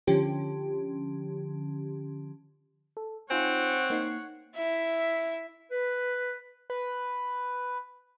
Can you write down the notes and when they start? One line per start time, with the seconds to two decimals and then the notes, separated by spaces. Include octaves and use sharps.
0.07 D3 F3 C#4 G4
2.97 A4
3.30 C4 D#4 F4 C#5 F#5 G#5
3.90 A#3 D#4 C7
4.56 E4 E5
5.71 B4
6.70 B4